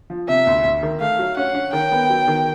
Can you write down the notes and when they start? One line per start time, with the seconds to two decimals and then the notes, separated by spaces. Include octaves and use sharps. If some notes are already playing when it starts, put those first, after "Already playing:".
0.10 F3
0.28 C3 E5
0.47 D2
0.65 D2
0.83 D#3
1.01 A3 F5
1.19 F#3
1.37 C#4 F#5
1.55 C#4
1.73 D#3 G5
1.92 B3
2.10 F#3
2.28 D#3